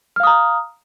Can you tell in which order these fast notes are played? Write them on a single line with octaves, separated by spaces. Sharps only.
F6 F5 D#6 A#5